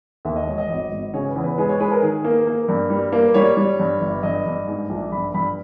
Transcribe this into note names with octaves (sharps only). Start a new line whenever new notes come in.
D#2 E5
D#5
E1 C#5
D#5
G#1
G#1
C#3 C#5
B4
E2
B4
G#3 B4
C#5
G#3 B4
A#4
D#3 G#4
A#3
A#3
G2
G3
A#3
G3 C#5
G3
G2
G1
G2 D#5
G2
G#2
A#1
G2 B5
G2 B5